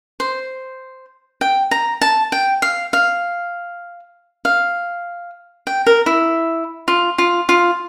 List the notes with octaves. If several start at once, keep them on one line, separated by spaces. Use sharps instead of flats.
C5
G5
A#5
A5
G5
F5
F5
F5
G5
A#4
E4
F4
F4
F4